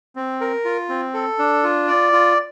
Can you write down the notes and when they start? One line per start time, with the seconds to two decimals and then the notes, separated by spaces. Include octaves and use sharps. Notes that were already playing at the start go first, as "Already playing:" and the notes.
0.16 C4
0.41 A#4
0.65 F4
0.89 C4
1.14 A4
1.39 D4
1.63 F4
1.87 D5
2.12 F4